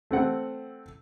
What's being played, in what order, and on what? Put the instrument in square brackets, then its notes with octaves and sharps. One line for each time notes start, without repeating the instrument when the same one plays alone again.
[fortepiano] A3 C4 F#5